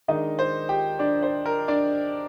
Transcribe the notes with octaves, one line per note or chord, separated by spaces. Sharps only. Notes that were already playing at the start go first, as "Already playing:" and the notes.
D#3 G#3 D4 D#4 D#5
C5
G4 G5
D4 D5
C5
A#4
D4 D5